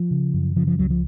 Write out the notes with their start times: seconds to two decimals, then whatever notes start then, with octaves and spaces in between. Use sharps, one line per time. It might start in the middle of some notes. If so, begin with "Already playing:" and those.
Already playing: F3
0.11 C#3
0.34 F#2
0.56 C#3 F3
0.67 F3
0.78 C#2 F#3
0.90 F3